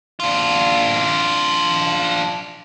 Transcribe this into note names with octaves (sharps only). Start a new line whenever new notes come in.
D4 F4